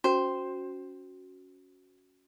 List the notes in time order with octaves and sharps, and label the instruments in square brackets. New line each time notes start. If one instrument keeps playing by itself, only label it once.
[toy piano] C#4 F#4 [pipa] C5